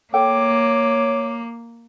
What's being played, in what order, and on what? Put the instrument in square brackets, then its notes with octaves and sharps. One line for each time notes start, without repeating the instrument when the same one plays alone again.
[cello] A#3 [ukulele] A4 G5 [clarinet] C#5 [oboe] D6